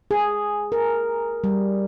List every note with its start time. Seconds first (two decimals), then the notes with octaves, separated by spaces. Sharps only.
0.11 G#4
0.72 A#4
1.44 G3